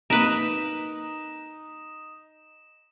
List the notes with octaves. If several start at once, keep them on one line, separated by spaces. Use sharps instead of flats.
C3 A#3 D#4 A#4 B4 E7